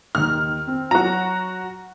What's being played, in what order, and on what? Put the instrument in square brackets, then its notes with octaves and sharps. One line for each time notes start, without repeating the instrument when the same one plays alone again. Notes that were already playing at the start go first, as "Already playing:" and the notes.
[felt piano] D#2 D#3 [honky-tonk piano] F6
[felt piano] C4
[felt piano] F#3 [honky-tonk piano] F#4 A#5